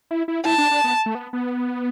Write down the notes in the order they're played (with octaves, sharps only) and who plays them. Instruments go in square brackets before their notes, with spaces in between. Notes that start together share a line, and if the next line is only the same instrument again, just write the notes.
[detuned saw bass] E4
E4
[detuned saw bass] E4 [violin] A5
[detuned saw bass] D4
D4
B3
A3
B3
B3